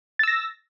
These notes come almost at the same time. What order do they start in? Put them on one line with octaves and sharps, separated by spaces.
A6 E6 A#6